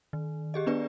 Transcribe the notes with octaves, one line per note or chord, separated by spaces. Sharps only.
D#3
G4 G#4 D#5
B3 D4 B4 D5